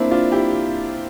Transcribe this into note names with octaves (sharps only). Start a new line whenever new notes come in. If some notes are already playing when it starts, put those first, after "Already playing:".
Already playing: A#3 C4 D4 E4
D4 F4
E4 G4